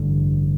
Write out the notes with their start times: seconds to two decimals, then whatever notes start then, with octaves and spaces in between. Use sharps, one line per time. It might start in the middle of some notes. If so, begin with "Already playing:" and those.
Already playing: A1 G2 D3